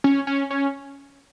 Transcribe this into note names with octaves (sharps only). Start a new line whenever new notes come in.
C#4
C#4
C#4